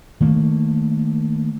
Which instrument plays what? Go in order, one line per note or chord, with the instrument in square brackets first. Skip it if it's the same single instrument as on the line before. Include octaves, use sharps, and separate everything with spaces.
[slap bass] D#3 A3 A#3